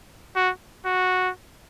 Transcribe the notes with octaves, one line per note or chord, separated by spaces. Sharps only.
F#4
F#4